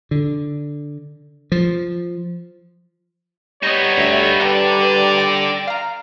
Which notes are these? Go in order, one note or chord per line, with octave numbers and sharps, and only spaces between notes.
D3
F3
G3 B3 D#4 C#5 D#5 B5 C#6
D2 E5 D#7
D3 A4 B4 D5 G5 A#5
G5 A#6 D7
F5 A#5